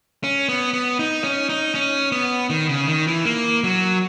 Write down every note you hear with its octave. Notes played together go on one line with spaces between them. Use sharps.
C#4
B3
B3
D#4
C#4
D#4
C#4
B3
D#3
C#3
D#3
E3
A#3
F#3